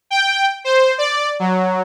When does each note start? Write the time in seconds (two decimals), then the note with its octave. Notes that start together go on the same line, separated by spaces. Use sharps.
0.10 G5
0.64 C5
0.98 D5
1.40 F#3